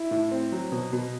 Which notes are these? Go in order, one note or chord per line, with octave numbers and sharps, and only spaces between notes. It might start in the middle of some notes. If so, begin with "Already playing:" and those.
Already playing: E4
A2
C4
F#3
B2
B2